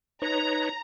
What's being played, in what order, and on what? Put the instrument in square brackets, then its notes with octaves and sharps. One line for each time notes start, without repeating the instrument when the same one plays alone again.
[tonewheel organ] D#4 B4 C#5 [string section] A#5